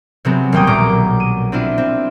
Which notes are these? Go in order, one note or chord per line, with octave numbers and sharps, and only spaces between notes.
C3 F#3 G#3 B3 C4
D#1 G3 A#3 G5 D#6
B1 A#2 F#3 A#5 D6
D#7
C4 D4 E4 F4
C4